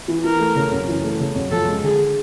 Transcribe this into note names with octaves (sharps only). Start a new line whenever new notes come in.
E3
E3 A#4
A3
C#3
F#2
E3
A3
C#3
F#2
F3 A4
G#3
D3 G#4